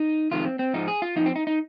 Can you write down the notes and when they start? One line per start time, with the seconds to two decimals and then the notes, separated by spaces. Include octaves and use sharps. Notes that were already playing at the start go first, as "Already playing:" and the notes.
Already playing: D#4
0.31 F2 C3 D#3 G#3 F4
0.45 C4
0.59 C4
0.73 G#2 F3 G#3 D#4
0.88 G#4
1.02 F4
1.16 F2 C3 F3 D#4
1.26 C4
1.36 D#4
1.47 D#4